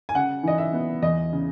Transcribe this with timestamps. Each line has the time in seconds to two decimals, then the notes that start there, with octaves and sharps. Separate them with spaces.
0.09 G#5
0.15 C#3 F#5
0.43 E3 D#5
0.58 E5
0.73 B3
1.02 E2 D#5
1.32 C#3